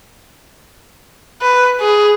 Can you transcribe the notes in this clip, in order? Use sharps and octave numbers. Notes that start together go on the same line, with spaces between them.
B4
G#4